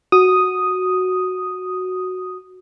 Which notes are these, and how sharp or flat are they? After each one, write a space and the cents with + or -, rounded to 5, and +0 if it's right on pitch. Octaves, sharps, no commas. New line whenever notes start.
F#4 +0 D#6 +0